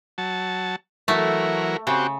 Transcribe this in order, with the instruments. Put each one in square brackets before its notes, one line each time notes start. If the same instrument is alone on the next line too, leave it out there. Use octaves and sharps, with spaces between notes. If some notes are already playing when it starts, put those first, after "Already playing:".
[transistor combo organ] F#3 A5
[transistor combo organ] E3 F#3 A#4 [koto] A3
[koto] C#3 [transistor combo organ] C4 F#4 G4